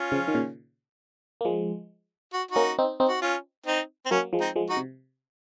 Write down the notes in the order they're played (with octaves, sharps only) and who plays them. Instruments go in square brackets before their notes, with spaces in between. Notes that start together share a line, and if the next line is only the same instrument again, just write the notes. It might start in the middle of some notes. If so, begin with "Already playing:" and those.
Already playing: [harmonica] C#4 F4
[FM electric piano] C#3 F3
D#3
A#2 C#3
A#3
F3 G#3
[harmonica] F#4
[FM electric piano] A#3 C#4 [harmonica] D#4 F#4
[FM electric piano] C4 D#4
C4 D#4
[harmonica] F#4
C#4 F4
C4 D#4
C4
[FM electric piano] F#3 A#3 [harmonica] C#4
[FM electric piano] F3 G#3
[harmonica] C4 D#4
[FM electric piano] F3 G#3
[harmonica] D#4 F#4
[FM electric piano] C3